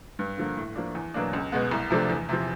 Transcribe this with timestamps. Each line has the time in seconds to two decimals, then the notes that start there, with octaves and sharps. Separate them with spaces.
0.19 G2
0.38 D3 F3 A#3
0.57 A2
0.75 F3 A#3 D4
0.95 E2
1.14 B2 F#3 A#3 D4
1.33 C#2
1.52 B2 G#3 B3
1.71 C2
1.90 C3 F3 A3 D4
2.10 E2
2.29 C3 F3